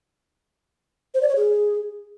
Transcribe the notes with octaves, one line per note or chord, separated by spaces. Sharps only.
C5
D5
C#5
G#4